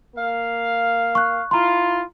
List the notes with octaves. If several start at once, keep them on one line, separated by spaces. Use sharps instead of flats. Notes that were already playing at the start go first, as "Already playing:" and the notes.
A#3 F5
C#6 F#6
E4 F4 A#5 C6